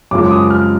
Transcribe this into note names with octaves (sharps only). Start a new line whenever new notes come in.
F#2 C#3 F3 G#3 D6
D6
D#6
F6